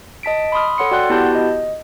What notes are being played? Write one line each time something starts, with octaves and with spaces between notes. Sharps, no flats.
D#5 A5 B6 D7
B5 C6 D#6 F6
A4 C#5 F#5 C6 C#7
F#4 D5 F#5 G5 C6 F#6
B3 E4 F#4 G4 A5 G6
D#5